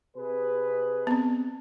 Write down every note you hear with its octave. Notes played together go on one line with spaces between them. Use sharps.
C3 G#4 B4
B3 C4